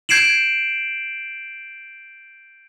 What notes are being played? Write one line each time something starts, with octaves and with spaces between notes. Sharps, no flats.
G6 G#6 C7 D7 E7 F#7